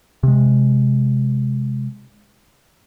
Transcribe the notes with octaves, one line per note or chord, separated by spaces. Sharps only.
C3 G#3